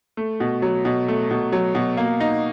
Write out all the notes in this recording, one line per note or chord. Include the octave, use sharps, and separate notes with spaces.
A3
B2
F#3
B2
A3
B2
F#3
B2
A#3
D#4